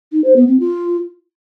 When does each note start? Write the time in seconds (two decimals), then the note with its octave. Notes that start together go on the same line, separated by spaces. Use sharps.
0.12 D#4
0.24 C5
0.36 B3
0.48 C4
0.59 F4